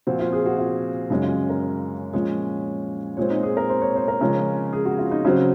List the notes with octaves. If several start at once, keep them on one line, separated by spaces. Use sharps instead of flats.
A#2 F3 C4 F#4
F4
G#4
F#4
F4
F#2 C#3 G#3 D#4
F4
A#4
A#2 F3 G#3 C#4 C#5
A#2 G#3 C4 C#5
D#4
G#4
A#4
C5
C#5
C5
A#4
C#3 F3 G#3 C#4
G#4
F#4
F4
D#4
C#3 F#3 C4